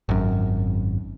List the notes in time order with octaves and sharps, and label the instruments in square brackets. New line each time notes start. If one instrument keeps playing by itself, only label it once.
[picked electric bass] G#1 F#2